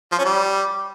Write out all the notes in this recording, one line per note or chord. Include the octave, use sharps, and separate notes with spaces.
F3
C#4
G3